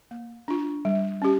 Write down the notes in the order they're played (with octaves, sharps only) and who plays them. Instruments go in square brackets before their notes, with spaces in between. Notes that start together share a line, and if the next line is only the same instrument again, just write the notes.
[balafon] A#3
D4 F4
G3
C#4 G4